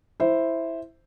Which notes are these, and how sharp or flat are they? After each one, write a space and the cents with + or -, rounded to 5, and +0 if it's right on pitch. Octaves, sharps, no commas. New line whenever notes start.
E4 +0 C5 +0